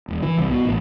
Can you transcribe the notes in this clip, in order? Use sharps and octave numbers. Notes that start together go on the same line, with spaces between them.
E1
E3
C2
B2
A1